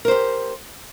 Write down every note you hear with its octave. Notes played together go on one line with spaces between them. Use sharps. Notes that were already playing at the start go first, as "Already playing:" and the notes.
G4 A#4 C5